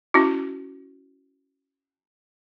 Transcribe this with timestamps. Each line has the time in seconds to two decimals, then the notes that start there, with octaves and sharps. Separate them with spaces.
0.14 C#4 E4 F#4